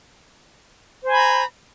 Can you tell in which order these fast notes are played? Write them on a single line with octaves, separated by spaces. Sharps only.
C5 G#5 B5 A#5